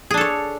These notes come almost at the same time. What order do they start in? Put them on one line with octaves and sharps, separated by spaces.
G#4 D4 A4 C#5